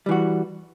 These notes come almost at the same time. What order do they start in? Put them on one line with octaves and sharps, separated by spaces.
G3 E3 F#4